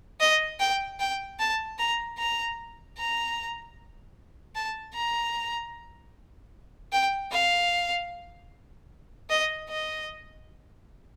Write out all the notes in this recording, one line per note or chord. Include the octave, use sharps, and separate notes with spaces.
D#5
G5
G5
A5
A#5
A#5
A#5
A5
A#5
G5
F5
D#5
D#5